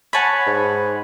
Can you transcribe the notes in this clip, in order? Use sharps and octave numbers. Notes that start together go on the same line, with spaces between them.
C#5 F#5 G#5 A5 B5
G#2